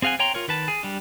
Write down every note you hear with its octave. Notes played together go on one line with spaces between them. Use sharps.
C4 G#4 F5 F#5 G#5
C#5 G5 A#5 C6
F4 A#4 C#5
D#3 B4 A5
G#4
G3 D4